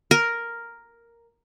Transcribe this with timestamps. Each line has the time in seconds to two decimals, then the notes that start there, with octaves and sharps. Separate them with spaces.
0.11 A#4